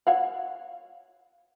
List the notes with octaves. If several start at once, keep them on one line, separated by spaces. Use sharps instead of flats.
C#5 F5 F#5